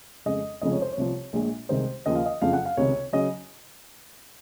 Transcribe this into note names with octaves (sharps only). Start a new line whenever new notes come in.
F2 C#3 G#3 D#5
F1 F2 C#3 F3 G#3 D#5
C#5
C5
C#5
C2 C3 F3
A#1 A#2 G#3
C2 C3 D#3 G#3 C5
D#2 C#3 F3 D#5
F5
D#5
F#1 F2 C#3 F3 F5
F#5
F5
C#2 C3 D#3 C#5
C#3 F#3 D#5